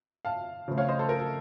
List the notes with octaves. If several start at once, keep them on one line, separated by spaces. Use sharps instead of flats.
F5 A5
C#3 F3 A3 C4
C#5 F5
C5 D#5
A4 C5
A#4
A4